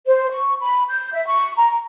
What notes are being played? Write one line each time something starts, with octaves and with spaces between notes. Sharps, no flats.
C5
C#6
B5
G6
E5
C#6
A#5